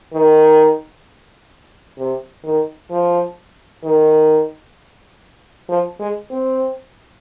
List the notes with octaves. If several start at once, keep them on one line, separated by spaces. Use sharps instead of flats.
D#3
C3
D#3
F3
D#3
F3
G#3
C4